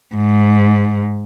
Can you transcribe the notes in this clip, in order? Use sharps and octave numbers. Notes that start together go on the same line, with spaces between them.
G#2